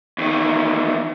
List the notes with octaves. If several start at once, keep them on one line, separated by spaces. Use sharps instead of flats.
E2 D#3